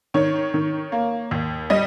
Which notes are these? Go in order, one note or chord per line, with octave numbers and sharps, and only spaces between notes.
D#3 C#5
D#3
A#3
D#2
G3 D#5